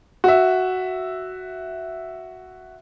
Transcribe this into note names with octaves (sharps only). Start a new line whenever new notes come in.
F#4 E5